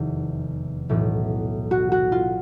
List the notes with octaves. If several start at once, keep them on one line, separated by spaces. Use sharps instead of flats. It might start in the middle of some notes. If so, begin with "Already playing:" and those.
Already playing: F1 E2 C3 D#3
B1 A2 E3
F#4
F#4
F4